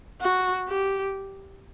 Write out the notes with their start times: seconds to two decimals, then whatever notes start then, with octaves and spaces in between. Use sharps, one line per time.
0.21 F#4
0.68 G4